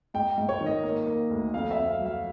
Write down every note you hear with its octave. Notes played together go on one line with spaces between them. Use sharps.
G#2 G5
G#2
C#5
D#3
D#5
A#3
A#3
D2
F2 F5
E5
F2
F5
F#3
F5